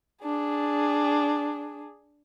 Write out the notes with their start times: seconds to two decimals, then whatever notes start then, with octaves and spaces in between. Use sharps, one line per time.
0.23 D4 G#4